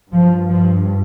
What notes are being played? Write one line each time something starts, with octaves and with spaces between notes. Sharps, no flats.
G2 F3
F3